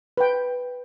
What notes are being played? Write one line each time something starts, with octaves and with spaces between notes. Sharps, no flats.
B4 G5